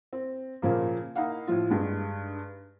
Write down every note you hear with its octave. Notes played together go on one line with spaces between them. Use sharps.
C4
A#2 C#3 F3 A#3
A#3 D#4 E4 F5 F#5
A2 F3 F4
G2 D#3 G#3